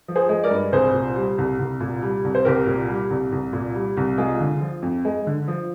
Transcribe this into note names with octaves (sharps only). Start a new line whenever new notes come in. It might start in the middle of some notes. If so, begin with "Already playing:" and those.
F3
G#4 C5
G#3
A#4 D5
G2
C2 G#4 C5
A#2
G3
C2
C2
A#2
G3
C2
C5
C2 G4 A#4
A#2
G3
C2
C2
A#2
G3
C2
G#3 F4 G#4
D3
F3
F2
G#3
D3
F3